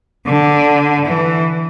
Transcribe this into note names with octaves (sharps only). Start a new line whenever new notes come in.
D3
E3